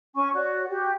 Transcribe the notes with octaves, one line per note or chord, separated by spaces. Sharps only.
C#4 G#5 C#6
F#4 C#5 D5
F#4 G4